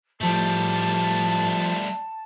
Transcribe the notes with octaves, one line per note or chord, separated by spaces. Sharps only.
A2 F3 G3 A3 A5 A6